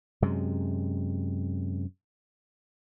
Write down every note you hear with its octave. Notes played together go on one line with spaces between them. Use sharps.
F#2 C3 G#3